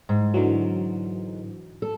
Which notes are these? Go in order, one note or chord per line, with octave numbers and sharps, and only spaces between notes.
G#2
D3 E3 F#3
A4